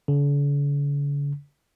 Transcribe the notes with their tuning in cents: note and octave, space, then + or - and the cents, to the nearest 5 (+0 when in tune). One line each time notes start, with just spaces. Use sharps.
D3 -45